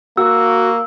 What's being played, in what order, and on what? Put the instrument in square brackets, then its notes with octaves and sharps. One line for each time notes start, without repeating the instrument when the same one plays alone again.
[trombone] A#3 [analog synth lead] F#4 [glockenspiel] E6